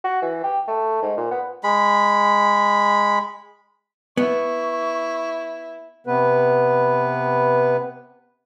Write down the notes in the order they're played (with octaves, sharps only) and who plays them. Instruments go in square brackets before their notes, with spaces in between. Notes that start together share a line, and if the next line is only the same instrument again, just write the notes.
[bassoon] F#4
E3
G4
A3
G#2
A#2
B3
[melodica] G#3 B5
[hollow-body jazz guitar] B3 [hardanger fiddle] E4 [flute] C#6
[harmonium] C3 B3 B4